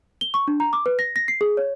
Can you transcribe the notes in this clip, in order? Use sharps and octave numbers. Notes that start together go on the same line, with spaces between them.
G7
C#6
D4
A#5
D6
B4
A#6
A#6
C7
G#4
C#5